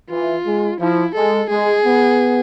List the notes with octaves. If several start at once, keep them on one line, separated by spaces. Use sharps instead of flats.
E3 F4
G#3
F3 E4
G#3 A4
G#3 G#4
B3